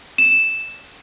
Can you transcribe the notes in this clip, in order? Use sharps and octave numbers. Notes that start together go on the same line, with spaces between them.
E7